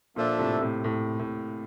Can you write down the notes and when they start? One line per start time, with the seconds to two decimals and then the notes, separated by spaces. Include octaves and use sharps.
0.16 A#2 F3 A#3 D4 A4 E5
0.39 A2 C3
0.62 A2 C3
0.84 A2
1.20 A2